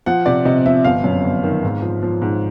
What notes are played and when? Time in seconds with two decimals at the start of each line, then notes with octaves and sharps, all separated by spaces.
0.06 F3 F#5
0.26 C3 D5
0.45 C3 D#5
0.65 F3 E5
0.84 G1 F5
1.04 F#2
1.24 G1
1.43 D#3
1.63 G#2
1.82 F3
2.02 F3
2.22 G#2